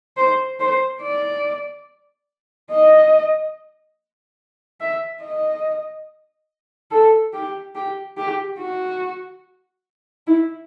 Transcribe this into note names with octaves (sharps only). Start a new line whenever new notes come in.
C5
C5
D5
D#5
E5
D#5
A4
G4
G4
G4
F#4
E4